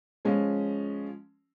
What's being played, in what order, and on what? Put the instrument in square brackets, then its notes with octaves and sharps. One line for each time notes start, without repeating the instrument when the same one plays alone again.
[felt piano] F3 G#3 C#4